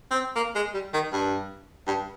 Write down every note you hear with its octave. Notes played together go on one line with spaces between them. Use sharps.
C4
A#3
G#3
G3
D#3
G2
G2